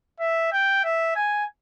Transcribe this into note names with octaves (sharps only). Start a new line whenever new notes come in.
E5
G5
E5
G#5